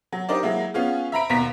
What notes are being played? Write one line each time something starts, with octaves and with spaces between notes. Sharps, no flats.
F#3
D4 D#4 G4 A#4 C5 D5
F#3 G#3 A#3 E4
B3 C#4 F4 G#4
E5 A#5 B5 D7
D#2 B2 A#5 B6